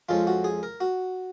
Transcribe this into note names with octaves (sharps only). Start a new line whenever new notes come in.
F2 F3 G#3 C#4 F4
F#4
G#4
A#4
F#4